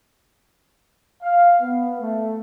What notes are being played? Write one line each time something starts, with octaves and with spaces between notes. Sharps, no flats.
F5
B3
A3